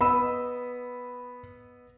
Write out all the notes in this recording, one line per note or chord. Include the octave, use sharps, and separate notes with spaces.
B3 D#5 B5 E6